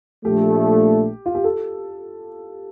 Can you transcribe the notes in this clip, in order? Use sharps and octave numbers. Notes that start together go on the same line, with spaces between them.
A#1 A#2 F3 A3 G4
F4
G4
A4